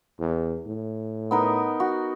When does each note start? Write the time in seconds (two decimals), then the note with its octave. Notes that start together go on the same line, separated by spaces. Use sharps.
0.20 E2
0.67 A2
1.31 B3 D#4 A#4
1.80 F#4